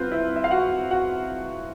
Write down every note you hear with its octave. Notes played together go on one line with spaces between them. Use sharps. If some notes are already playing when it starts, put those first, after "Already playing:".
Already playing: C2 C3 C4 F4 B4 C5
E4 E5
E5
F5
F#4 F#5
F#4 F#5